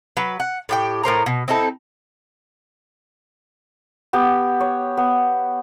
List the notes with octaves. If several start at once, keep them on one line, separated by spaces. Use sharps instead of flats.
F#3 B4
F#5
A2 G4 G5
A2 A#4 C5 A#5
B2
C4 D#4 E4 A4
B3 G4
C#5
B3